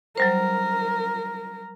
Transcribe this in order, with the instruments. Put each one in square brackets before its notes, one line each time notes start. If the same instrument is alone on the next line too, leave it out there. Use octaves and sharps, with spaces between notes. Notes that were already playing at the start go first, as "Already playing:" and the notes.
[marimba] F#3 G3 C5 [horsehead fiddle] A#4